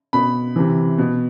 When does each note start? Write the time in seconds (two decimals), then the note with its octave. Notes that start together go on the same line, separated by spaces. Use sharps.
0.13 B2 B5
0.56 C3 E3
0.98 B2